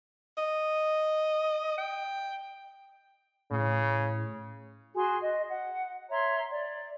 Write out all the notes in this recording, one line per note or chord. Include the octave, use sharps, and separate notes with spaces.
D#5
G5
A2 C#3
F#4 G#4 G#5 C6
D#5
F#5
C#5 E5 A#5 C6
D5